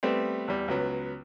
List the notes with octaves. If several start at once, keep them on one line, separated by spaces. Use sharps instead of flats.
G3 A3 B3 C4
E2 G3
C#2 F#3 B3